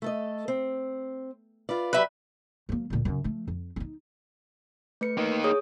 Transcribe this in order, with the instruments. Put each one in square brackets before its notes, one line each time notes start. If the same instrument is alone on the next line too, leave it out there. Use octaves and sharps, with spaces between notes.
[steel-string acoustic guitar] A3 A4 D#5
C4
F4 B4 D5
[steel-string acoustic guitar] F#3 G4 [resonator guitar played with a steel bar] B4 E5
[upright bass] F#3 A#3
D2 A#2
F#2 C#3
F3 A3
F2
C#4 D#4
[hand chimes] A3 B4 C#7
[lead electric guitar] A#3 D#4
[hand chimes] G#4 C#5 D#6